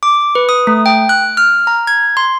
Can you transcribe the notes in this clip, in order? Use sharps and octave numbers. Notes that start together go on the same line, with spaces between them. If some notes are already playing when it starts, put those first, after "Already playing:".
D6
B4
D#6
A3
G5
F#6
F6
A#5
G#6
C6